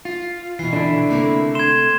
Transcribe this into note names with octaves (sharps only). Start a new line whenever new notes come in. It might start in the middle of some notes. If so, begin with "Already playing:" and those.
F4
B2 E3 C7
D3 D4 E4
C3 A3 A#3
C6 G#6 E7